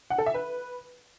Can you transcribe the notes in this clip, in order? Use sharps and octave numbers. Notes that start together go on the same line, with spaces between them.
F#5
A4
E5
B4